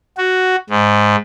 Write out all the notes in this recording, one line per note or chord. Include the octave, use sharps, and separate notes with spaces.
F#4
G#2